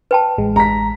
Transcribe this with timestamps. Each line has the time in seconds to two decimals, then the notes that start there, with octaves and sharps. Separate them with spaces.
0.11 B4 G5 A5
0.37 A1 G#3
0.56 A#5 B6